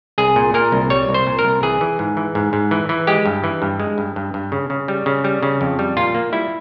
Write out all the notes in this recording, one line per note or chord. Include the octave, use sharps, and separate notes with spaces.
C2 G#4
A#2
A#2 A#4
C2
G3 C#5
C2
C5
A#2
A#4
C2
E3 G#4
E3
G#2
E3
G#2
G#2
E3
E3
G#3 G4
G2
E3
G2
G#3
G2
G2
G2
C#3
C#3
G3
C#3
G3
C#3
F2
G3
A#2 F4
A#3
G3 E4